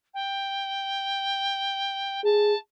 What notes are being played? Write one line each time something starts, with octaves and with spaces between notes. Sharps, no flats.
G5
G#4 A5